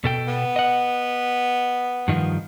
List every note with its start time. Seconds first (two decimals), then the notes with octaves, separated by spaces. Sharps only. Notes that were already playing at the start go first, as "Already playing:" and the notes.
0.04 B2 A4 G5
0.28 B3
0.56 D#5 F#5
2.08 G2 D#3 F3